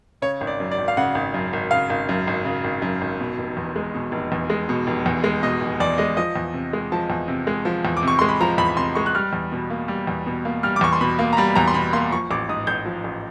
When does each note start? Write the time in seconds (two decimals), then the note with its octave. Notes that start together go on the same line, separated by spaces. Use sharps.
0.22 C#3 C#5
0.41 G#1
0.47 D5
0.60 F#2
0.71 D5
0.78 G#1
0.88 F5
0.97 C#3 F#5
1.15 G#1
1.34 F#2
1.53 G#1
1.71 C#3 F5
1.90 G#1
2.09 F#2
2.27 G#1
2.45 C#3
2.64 G#1
2.82 F#2
3.01 G#1
3.20 B2
3.38 F1
3.57 E2
3.76 G#3
3.94 B2
4.12 F1
4.32 E2
4.50 G#3
4.69 B2
4.87 F1
5.06 E2
5.24 G#3
5.43 B2 D#5
5.61 F1
5.80 E2 D5
5.98 G#3 D#5
6.17 F3 D#5
6.36 E2
6.54 C3
6.73 G#3
6.92 F3 A5
7.10 E2
7.28 C3
7.47 G#3
7.65 F3
7.85 E2
7.97 D6
8.03 C3 C#6
8.19 G#3 C6
8.29 B5
8.40 F3 A#5
8.58 E2 B5
8.69 B5
8.77 C3 C6
8.95 G#3 C#6
9.06 F#6
9.15 G3 F6
9.33 E2
9.52 B2
9.70 A#3
9.88 G3
10.07 E2
10.27 B2
10.45 A#3
10.63 G3 F6
10.76 D6
10.81 E2 C#6
10.93 C6
11.01 B2 B5
11.19 A#3
11.33 A#5
11.37 G3 B5
11.55 E2 A#5
11.68 C6
11.74 B2 B5
11.93 A#3 C6
12.11 F3 C#6
12.31 A1 D6
12.49 G#2 D#6
12.67 A1 G6
12.86 F3
13.04 A1